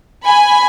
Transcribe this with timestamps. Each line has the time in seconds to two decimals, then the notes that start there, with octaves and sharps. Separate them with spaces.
0.25 G#5 B5